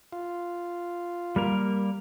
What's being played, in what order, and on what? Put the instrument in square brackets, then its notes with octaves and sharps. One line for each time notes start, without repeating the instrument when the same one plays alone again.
[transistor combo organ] F4
[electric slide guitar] G3 A#3 A#4